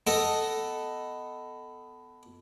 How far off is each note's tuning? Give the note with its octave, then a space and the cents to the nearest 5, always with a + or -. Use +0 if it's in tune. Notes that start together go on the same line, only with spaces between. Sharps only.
B3 +15 A4 +0 D#5 +0